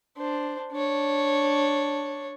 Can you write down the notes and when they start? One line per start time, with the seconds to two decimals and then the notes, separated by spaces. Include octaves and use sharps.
0.17 D4 C5
0.72 D4 C#5